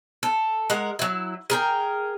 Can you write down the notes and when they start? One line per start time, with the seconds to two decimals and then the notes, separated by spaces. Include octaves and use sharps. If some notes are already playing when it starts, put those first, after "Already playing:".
0.23 A4
0.70 G#3 A#4 F#5
0.99 F#3 E4
1.50 G#4 A#4 G5